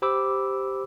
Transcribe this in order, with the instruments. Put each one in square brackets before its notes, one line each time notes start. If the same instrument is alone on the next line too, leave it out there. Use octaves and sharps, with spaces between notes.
[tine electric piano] G4 C5 B5 D6 E6